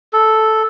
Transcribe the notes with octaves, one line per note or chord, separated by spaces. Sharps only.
A4